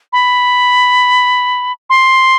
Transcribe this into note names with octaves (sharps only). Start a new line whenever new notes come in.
B5
C6